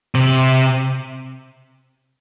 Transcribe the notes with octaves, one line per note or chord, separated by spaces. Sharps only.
C3